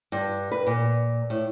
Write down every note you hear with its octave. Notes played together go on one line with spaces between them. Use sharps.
G2
B4
A#2
A2